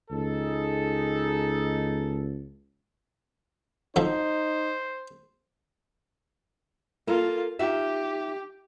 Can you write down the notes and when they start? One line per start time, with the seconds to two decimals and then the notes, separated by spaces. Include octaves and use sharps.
0.11 C#2 D#4 G#4 A4
3.96 F2 F3 D#4 C5
7.07 A#3 F4 A4 A#4
7.59 D#4 F4 G4 E5